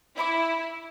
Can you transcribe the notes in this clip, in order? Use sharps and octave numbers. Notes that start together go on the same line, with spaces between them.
E4 E5 B5 D6